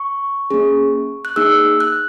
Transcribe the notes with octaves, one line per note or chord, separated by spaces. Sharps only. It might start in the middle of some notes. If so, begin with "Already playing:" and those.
Already playing: C#6
A#3 C#4 G#4
F#6
A#3 D#4 G#4 E6
F#6